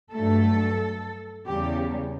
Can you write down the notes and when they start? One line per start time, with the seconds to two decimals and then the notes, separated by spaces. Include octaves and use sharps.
0.13 G2 F#3 A3 A4
1.47 E2 C#3 G3 G4